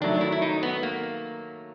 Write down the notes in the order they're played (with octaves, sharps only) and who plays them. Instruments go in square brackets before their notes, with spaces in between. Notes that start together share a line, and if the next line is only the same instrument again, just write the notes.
[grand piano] D#3 F#3 A3 [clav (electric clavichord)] D4
[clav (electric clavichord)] E4
E4
D#4
B3
A#3